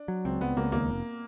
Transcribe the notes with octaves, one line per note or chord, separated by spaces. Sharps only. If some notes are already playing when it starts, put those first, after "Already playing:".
Already playing: D4
F#3
C#2 C4
C#2 B3
C#2 A#3
D#2 A#3
F1